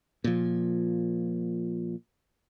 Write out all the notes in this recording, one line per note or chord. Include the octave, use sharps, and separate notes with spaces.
A#2 F3